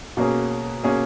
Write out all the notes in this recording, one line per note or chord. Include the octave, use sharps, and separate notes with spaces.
B2 A#3 C#4 G#4
B2 A#3 C#4 G#4